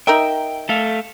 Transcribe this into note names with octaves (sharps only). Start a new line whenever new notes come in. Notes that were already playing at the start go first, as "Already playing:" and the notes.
D#4 A#4 E5 G5
A3 A4 F5